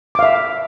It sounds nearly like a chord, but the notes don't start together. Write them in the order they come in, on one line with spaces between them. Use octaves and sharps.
D6 F5 E5